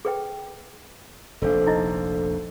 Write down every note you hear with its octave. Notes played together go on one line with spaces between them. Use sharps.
G#4 B4 G5
F1 A#1 D4 A4 C5 F5
D#4 E4 D#5